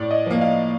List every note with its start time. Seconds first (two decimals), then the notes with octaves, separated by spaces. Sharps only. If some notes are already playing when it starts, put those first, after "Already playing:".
Already playing: A2 C#5 D5
0.11 D#5
0.26 F3 A#3
0.41 F5